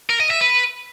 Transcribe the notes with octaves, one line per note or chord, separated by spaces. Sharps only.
A#4
D#5
E5
B4